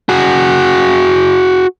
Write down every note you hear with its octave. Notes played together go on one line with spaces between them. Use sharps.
F#4 G#4